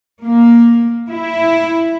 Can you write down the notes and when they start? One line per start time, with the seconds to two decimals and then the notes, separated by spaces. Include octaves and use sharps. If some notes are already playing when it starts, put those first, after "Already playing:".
0.24 A#3
1.10 E4